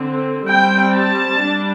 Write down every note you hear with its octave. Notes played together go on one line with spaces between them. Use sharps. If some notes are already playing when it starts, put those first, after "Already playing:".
Already playing: D3 C4
G3 C4 G5
A5
G3 D4